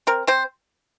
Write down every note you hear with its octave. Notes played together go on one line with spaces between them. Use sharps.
C4 A#4
C4 C5